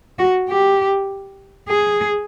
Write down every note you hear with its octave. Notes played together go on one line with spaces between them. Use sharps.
F#4
G4
G#4